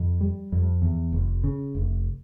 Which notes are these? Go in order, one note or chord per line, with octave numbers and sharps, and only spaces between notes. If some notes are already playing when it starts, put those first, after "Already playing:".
Already playing: F2
G3
F2
E2
F1
C#3
F1